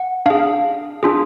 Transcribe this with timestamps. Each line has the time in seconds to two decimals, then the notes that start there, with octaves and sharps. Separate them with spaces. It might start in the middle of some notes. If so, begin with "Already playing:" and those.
Already playing: F#5
0.26 D4 G#4 F5
1.03 D4 F4 G#4